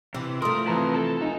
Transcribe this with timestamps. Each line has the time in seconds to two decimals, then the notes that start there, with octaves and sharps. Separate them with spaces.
0.14 C3 E3
0.42 F3 A3 A#4 C6 D#6
0.67 C3 E3 C4 B4 A5 A#5
0.96 A4
1.22 D#4 D#5 F5 G#5